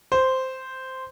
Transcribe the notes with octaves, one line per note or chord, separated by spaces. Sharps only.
C5